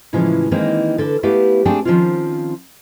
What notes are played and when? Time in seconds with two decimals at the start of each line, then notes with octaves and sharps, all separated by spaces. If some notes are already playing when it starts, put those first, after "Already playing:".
0.13 A2 C#3 E3 F3 G#3
0.51 D#3 E3 G#3 A#3 C4 D#4
0.98 D3 A4 B4 E5 A5
1.23 A3 B3 E4 G4 B4 F5
1.65 A3 C4 D4 G#4 G5 A5
1.85 D#3 F3 A3 C4 C#4 F4